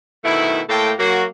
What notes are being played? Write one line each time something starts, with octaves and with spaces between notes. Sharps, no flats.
B2 D#3 A3 E4
A2 A3 A#3 A4 G5
F#3 A#3 F#4